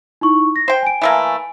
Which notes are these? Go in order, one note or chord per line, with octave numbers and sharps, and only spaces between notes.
D#4 E4 C#6
A#6
C5 G5 C7
G#5 D7
E3 A3 A#3